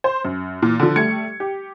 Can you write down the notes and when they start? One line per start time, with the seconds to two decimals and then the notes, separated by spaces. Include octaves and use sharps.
0.04 C5
0.25 F#2
0.62 A#2 E3
0.80 D3 F3
0.96 G3 A3 G#6 C#7
1.40 G4